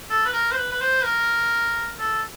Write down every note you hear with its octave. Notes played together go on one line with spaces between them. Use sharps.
A4
B4
A#4
C5
B4
B4
C5
A#4
A4